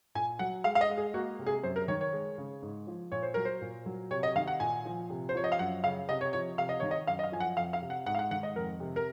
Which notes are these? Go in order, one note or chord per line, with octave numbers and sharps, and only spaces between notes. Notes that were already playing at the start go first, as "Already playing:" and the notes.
A#2 G#5
F#3 F#5
G#3 F5
F5
D#5
G#3
G#4
A#3 F#4
C3
G#4
F#2 C5
A#4
D#3 C#5
C#5
G#3
C#3
G#2
F3
A#2 C#5
C5
F#3 A#4
C5
A#2
F#3
C3 C#5
D#5
D#3 F5
F#5
A#2 G#5
F3
C3
C5
F3 C#5
D#5
F5
F#2 F#5
C#3 F5
C3 D#5
C#5
F3 C#5
C3 F5
D#5
D#3 C#5
D#5
F#2 F5
D#5
F5
F3 G#5
F#5
F2 F5
F5
C3
F#5
G#2 F#5
F5
F#5
D#3 F#5
D#5
F2 A#4
C3
A#4